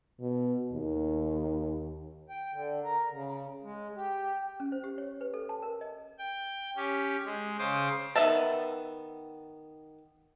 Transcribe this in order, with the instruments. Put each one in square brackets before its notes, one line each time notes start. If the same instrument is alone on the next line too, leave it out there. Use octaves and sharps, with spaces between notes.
[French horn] B2
D#2
[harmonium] G5
D3
A#4
C#3
G#3
G4
[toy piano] C#4
C5
G4
C#5
B4
A4
A5
A#4
D#5
[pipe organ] G5
C#4 G4
G#3
C#3 C5 D6 D#6
[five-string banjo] D#3 B3 B4 E5 A5